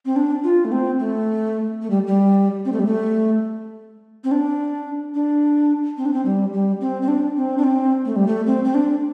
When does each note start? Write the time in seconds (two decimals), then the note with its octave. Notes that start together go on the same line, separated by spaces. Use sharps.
0.06 C4
0.16 D4
0.44 F4
0.65 A3
0.72 C4
0.99 A3
1.82 A3
1.90 G3
2.07 G3
2.65 C4
2.73 A3
2.79 G3
2.87 A3
4.24 C4
4.31 D4
5.15 D4
5.98 C4
6.06 D4
6.14 C4
6.25 G3
6.53 G3
6.81 C4
7.02 C4
7.08 D4
7.36 C4
7.58 D4
7.64 C4
8.05 A3
8.16 G3
8.27 A3
8.47 C4
8.64 C4
8.74 D4